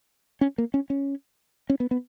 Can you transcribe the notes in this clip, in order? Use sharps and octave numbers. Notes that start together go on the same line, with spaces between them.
C#4
A#3
C#4
C#4
C#4
B3
B3